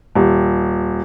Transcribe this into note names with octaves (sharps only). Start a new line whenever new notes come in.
D#1